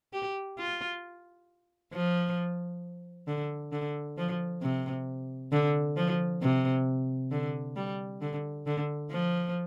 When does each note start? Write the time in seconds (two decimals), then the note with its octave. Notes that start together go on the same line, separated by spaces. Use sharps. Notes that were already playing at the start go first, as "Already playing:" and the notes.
0.13 G4
0.58 F4
1.93 F3
3.28 D3
3.72 D3
4.18 F3
4.63 C3
5.52 D3
5.97 F3
6.42 C3
7.32 D3
7.76 G3
8.21 D3
8.66 D3
9.11 F3